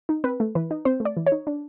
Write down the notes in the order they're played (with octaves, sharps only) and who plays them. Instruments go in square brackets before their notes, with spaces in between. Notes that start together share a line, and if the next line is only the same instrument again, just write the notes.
[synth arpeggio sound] D#4
C4 B4
A3
E3 B4
D#4
C4 C5
A3
D5
E3
C#5
D#4
D4